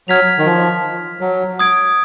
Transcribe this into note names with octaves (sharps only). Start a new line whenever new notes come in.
F#3 F6 G#6 B6 F7
D#3
F3
F#3
D#6 G#6 D7